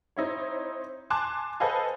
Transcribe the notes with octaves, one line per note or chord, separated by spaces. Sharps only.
C4 D#4 E4 C#5
G#5 A5 C6 D6 F#6
A4 B4 C5 D#5 F5 G#5